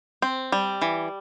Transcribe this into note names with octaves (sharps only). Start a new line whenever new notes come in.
C4
G3
E3